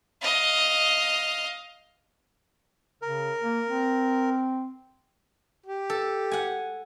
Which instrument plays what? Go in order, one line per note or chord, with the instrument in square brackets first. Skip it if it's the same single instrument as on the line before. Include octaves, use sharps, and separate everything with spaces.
[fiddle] D#5 F5
[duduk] C#3 [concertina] A#4
[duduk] A#3
C4
[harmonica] G4
[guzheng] A4
F#5 G#5